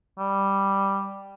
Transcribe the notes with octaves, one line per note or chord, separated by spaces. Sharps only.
G3